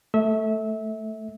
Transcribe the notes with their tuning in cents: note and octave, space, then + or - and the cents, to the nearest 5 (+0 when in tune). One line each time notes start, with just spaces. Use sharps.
A3 +5 E5 -25